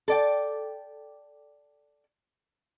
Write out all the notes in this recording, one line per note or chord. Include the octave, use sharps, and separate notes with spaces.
A4 D5 G5